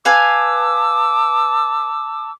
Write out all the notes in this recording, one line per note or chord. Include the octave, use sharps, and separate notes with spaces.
B4 F5 G#5 A5 D6 E6